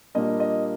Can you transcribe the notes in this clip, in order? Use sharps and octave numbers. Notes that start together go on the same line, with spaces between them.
A#2 G3 A#3 D4 D#5
D#5